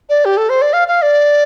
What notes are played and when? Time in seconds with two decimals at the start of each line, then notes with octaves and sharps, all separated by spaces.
0.09 D5
0.25 G4
0.37 A4
0.49 C5
0.62 D5
0.73 F5
0.88 F5
1.02 D5